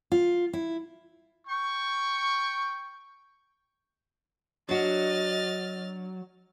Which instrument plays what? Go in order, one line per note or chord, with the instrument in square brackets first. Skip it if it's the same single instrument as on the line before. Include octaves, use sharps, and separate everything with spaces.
[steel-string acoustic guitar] F4
E4
[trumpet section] G5 C#6
[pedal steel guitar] F#3 [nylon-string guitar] D4 F#4 [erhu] D#5 [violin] F6 A6